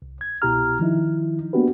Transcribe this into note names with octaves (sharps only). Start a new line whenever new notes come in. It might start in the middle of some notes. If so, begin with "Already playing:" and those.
C2
G#6
C2 B2 E4 G4 A#5 F6
D#3 F3 D#4 E4
A#3 B3 D4 F#4 G4 B4